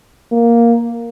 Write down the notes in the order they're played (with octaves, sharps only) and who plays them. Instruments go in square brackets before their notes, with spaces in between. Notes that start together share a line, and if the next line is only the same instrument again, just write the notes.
[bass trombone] A#3